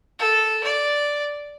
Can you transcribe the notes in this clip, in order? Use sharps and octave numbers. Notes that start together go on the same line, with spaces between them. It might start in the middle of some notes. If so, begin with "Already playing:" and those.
A4
D5